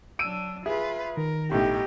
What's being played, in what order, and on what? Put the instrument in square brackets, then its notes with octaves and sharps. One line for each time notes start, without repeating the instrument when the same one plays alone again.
[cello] F#3 D4 [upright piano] E6 D7 D#7
[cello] F4 B4 [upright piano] G#4 [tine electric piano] E5
[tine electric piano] D#3 [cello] A#4
[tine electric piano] G#1 [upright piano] A2 D#3 [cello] B3 D#4 [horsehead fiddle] G4